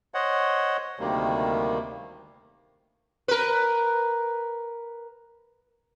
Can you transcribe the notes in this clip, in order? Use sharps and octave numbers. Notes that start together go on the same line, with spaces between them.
C5 C#5 D#5 F#5
D2 C3 D#3 G3 A#3
A#4 B4